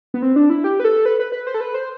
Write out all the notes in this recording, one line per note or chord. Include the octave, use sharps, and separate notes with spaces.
B3
C4
D4
E4
G4
B4
A4
B4
B4
B4
C5
A4
B4
C5